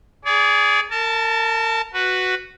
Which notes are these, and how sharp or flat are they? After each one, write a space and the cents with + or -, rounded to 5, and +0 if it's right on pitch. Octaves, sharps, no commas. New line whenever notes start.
G#4 +0 D5 -35
A#4 -35 A5 +0
F#4 +0 B4 +0